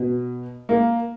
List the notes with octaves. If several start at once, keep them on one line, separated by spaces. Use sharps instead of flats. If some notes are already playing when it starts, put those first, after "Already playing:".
Already playing: B2
A#3